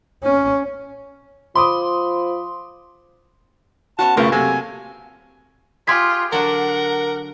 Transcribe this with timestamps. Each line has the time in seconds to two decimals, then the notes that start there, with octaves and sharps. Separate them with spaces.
0.24 C#4
1.55 F3 B5 C6 D6 D#6
3.99 B3 C#4 F#4 A5
4.17 B1 F#2 C#3 A3 F4 A#4 B4
4.32 C3 F#3 A#3 A4 G#5
5.87 F4 G4 G#4 C6 G#6 B6
6.32 D3 F#3 D4 A#4 F#5